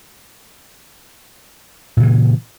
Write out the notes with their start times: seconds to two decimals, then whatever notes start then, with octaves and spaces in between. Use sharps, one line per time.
1.97 A#2
2.00 C#3
2.03 E3